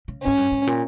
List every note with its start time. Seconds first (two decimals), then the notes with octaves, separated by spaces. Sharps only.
0.08 C#3
0.23 G#2 C#4
0.37 G2
0.52 G#2
0.67 A#2